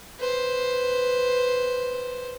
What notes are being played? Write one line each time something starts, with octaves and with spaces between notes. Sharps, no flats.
B4 C5